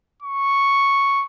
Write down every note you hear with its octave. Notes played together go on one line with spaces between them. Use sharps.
C#6